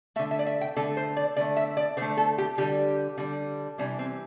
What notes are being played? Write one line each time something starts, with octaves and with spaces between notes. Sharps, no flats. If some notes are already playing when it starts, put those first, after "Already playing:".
D3 A3 E5
E5
D5
E5
G5
D3 A3 A4
C5
D5
D3 A3 D5
E5
D5
D3 A3 C5
A4
G4
D3 G3 G4
D3 G3
C3 E3 G3 D4
C4